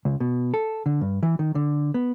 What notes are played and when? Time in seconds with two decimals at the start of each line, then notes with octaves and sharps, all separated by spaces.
0.05 C#2
0.20 B2
0.54 A4
0.86 D3
1.01 G2
1.23 E3
1.39 D#3
1.55 D3
1.94 B3